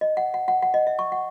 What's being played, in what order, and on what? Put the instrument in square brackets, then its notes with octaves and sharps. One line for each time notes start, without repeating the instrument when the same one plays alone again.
[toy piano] D#5
F#5
F#5
F#5
F#5
D#5
E5
C#6
F#5